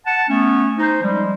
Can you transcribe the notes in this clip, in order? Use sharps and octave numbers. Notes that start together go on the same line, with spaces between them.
F#5 A5
A3 B3 C#4
D#4 C5
F3 G3 G#3